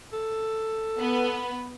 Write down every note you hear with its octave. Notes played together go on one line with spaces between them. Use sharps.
A4
B3 B4